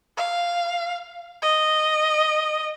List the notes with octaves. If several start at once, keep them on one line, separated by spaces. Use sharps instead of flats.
F5
D#5